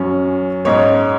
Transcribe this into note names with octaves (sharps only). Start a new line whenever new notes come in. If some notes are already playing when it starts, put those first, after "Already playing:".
Already playing: F#2 F#3 C#4
G#2 G#3 C#4 C#5